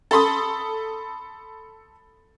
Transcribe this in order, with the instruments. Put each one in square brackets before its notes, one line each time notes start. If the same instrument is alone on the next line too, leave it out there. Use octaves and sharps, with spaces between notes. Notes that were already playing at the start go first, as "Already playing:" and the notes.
[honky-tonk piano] A4 B5 C6 D#6